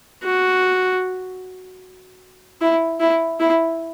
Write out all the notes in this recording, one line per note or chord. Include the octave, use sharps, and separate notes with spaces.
F#4
E4
E4
E4